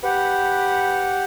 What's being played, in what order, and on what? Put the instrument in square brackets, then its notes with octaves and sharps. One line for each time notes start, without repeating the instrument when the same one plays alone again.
[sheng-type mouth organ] G4 F#5 [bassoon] B4